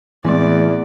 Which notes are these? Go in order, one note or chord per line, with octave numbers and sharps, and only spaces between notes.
E2 A2 E3 G#3 C4 D5